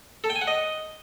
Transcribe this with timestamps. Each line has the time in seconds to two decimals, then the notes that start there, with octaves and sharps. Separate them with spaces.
0.24 A4
0.30 G5
0.36 G#5
0.41 F#5
0.47 D#5